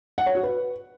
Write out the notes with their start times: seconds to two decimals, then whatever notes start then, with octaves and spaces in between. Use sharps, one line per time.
0.18 F#5
0.26 C#5
0.35 F#4
0.43 B4